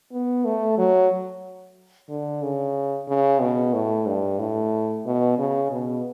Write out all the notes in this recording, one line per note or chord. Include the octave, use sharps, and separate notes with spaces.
B3
A3
F#3
D3
C#3
C#3
B2
A2
G2
A2
B2
C#3
B2